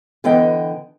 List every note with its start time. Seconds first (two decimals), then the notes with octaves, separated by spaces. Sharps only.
0.24 D3 E3 B3 D#5 G5